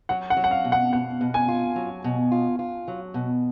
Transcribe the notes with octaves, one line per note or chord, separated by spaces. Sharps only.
F#3 F#5
F#5
F#3
F#5
F5
B2
F#5
B2 F#5
B2
G#5
F4
F#3
B2
F4
F4
F#3
B2